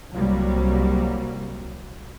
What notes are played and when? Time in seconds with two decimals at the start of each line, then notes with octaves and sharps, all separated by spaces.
0.13 C2 C3 F#3 G3 A#3